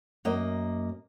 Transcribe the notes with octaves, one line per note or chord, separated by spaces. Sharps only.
F#2 A#3 D#5